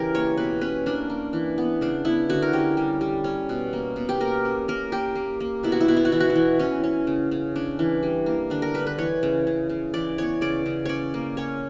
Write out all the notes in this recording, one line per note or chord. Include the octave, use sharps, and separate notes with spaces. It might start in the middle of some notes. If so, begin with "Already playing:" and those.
Already playing: C#3 E3 G4 A#4
A#3 C#5
B2 B4
C#4 B4
A#3 D4
A#3
E3
B3
C#3 D4
B3 E4
D3 F#4
A#4
C#4 G4
G3
G3
C#4
B2
A#3
B2
G4
A#3 A#4
C#4
A#3 A#4
A#3 G4
A#3
A#3
B2 E4
F#4
E4
B2 F#4
E4
F#4
E3 E4
F#4
E4
E3
E3 C#4
C#4
C#3
C#3
C#4 D4
E3
G3
A#3
D3 D4
A#4
D3 B4
B4
E3 C#5
C#3
C#3
C#3
E3 D5
B3 C#5
C#3 D5
C#3
C#4 C#5 D5
A#3
C#4 C#5